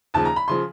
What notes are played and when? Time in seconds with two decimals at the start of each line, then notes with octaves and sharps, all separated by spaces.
0.14 D#2 C#3 F3 A5
0.25 A#5
0.36 B5
0.48 C#3 F3 C6